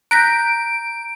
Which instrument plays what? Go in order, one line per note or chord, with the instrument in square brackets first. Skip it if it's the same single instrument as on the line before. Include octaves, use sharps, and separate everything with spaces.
[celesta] A#5 G6 [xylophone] F#6 A#6 B6 [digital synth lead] D7